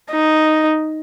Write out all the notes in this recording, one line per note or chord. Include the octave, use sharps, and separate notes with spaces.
D#4